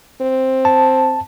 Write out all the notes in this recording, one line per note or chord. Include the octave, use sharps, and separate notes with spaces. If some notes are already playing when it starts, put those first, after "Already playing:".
C4
A5